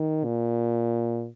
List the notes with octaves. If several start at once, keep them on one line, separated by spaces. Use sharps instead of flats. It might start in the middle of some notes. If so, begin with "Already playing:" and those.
Already playing: D#3
A#2